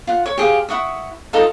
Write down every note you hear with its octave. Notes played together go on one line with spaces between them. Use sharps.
F4 F#5
C#5 C#6
G4 G#4 C5 F5
E4 F#5 C#6 D#6
D#4 F4 A4 D#5